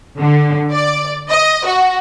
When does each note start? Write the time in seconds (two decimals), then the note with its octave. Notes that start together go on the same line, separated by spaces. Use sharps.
0.20 D3
0.74 D5
1.30 D#5
1.66 F#4